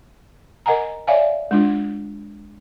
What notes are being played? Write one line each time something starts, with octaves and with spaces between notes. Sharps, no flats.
A#4 D#5 F#5 G#5 A#5
C#5 D5 E5 F5 G#5
G#3 D4 F4